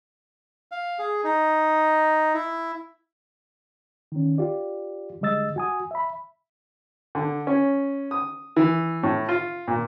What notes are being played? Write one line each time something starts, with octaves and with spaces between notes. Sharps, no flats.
F5
G#4
D#4
E4
D#3 C#4
F4 G4 D5
D3 G3 G#3 D#5 E6 A6
F#4 G#5 D#6
E5 B5
D3
C#4
D#6
E3
A2
F4
A#2